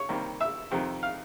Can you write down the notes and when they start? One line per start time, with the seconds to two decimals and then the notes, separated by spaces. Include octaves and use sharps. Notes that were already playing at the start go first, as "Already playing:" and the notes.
Already playing: C#5
0.09 C3 D#3 G3 A#3
0.40 E5
0.71 F2 C3 D#3
1.03 F5